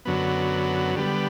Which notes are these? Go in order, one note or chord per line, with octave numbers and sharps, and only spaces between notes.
F#2 D3 F#3 B3
D3 G3 B3